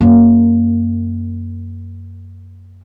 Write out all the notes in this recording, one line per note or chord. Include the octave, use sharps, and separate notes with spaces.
F#2 A#3